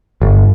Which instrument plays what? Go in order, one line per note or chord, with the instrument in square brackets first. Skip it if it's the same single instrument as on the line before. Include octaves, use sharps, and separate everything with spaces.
[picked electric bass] G1